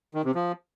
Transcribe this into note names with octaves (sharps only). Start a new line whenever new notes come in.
D#3
C3
F3